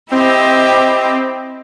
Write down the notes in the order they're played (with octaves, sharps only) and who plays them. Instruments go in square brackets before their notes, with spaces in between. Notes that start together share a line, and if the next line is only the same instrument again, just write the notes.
[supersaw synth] C4 [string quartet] E4 G4 D#5